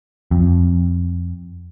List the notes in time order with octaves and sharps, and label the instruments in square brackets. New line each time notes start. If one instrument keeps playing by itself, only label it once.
[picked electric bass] F2